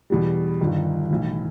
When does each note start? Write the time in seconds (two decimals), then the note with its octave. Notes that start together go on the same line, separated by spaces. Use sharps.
0.10 E2 B2 G3
0.61 G1 G2 D#3
1.10 B1 A2 E3